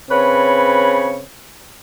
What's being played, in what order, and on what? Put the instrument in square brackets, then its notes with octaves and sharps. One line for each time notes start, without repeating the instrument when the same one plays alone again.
[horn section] C#3 C4 B4 C#5